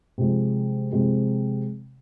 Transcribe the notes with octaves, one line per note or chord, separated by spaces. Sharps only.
C3 F3 G#3
C3 F3 G#3 C4